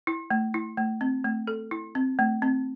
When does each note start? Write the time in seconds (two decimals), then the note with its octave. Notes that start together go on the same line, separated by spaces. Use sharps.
0.07 E4
0.30 A3
0.54 E4
0.77 A3
1.01 C4
1.25 A3
1.47 A4
1.71 E4
1.95 C4
2.19 A3
2.42 C4